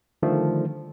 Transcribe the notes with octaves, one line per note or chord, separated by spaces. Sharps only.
D3 D#3 F3 G3 A3